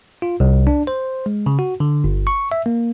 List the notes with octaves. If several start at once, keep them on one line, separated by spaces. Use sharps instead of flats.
F4
C2
D4
C5
G#3
C#3
F#4
D3
G1
C#6
E5
A#3